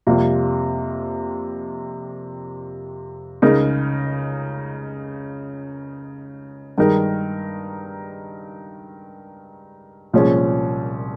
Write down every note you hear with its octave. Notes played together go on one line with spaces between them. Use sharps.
F2 C3 G3 A#3 F4
C#2 C#3 G#3 D#4 A#4
G2 D#3 G#3 D#4 A#4
C2 A#2 F3 G#3 C#4